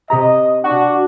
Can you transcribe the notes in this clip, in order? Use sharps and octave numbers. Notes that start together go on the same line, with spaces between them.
C3 G4 D#5 A#5
D4 F#4